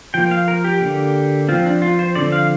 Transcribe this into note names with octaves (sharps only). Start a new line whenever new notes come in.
F3 A#3 G5
F5
A#4
G4
D3 A#3
F3 C4 F4
D4
F4
C5
D3 F3 C4 D5
F5